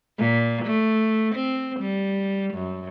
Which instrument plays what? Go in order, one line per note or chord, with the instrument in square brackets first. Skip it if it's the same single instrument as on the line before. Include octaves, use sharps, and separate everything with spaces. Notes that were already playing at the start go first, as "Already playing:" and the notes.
[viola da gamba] A#2
A3
C4
G3
F#2